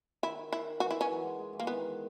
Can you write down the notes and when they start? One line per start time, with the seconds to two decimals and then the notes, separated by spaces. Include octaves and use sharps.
0.23 D#3 E4
0.53 E4
0.80 E3 F#4
0.91 E4
1.01 C#4
1.10 F#3
1.24 G#3
1.39 G#3
1.53 E3
1.60 A#3
1.67 D#3 B3